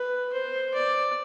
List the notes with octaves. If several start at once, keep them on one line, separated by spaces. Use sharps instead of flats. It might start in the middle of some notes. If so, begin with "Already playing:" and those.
Already playing: B4
C5
D5